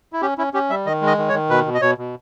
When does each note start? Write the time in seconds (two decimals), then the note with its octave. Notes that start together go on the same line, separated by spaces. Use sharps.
0.13 E4
0.22 C#4 G4
0.38 C#4 E4
0.53 C#4 G4
0.70 G3 E5
0.86 D#3 D#5
1.01 G#3
1.07 D#5
1.18 D#3
1.29 C#5
1.33 D#3
1.50 B2 B4
1.66 B2
1.74 D#5
1.81 B2 C#5
1.98 B2